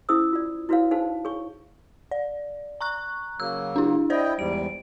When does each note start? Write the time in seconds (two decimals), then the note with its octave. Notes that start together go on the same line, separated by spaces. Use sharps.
0.09 C#4 E4 G#4 C5 D#6 E6
0.33 F4 D5
0.69 E4 F#4 B4 C#5 F5
0.91 D#4 G#4 C5 F5 A5
1.25 G#4 C#5 C#6
2.11 D5
2.81 A#5 C#6 F#6
3.40 C#3 F#3 A#3 E6
3.76 D4 E4
4.10 E4 C5 D5 D#5 G5
4.39 E2 G#2 G3 D7